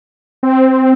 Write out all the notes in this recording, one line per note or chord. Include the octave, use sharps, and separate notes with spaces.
C4